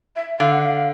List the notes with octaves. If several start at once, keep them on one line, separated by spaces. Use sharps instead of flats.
E5
D3 F5
F#5
F5